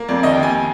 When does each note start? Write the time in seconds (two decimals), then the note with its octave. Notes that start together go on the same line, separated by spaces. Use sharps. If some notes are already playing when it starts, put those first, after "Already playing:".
Already playing: A#3
0.08 F2 D5
0.23 D#2 D#5
0.33 G5
0.38 D#2
0.43 G#5